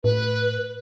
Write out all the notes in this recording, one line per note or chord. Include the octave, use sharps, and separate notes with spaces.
A2 B4